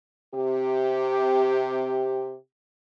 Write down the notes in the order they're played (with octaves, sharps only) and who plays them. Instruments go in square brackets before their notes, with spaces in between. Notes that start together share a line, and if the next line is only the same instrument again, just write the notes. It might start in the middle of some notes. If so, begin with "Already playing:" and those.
[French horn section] C3 G4